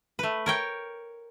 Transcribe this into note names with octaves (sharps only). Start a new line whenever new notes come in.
A3 B4
A#4 C#5 G5